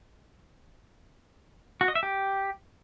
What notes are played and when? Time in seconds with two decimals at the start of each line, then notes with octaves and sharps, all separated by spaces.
1.81 F#4
1.88 D#5
1.95 E5
2.03 G4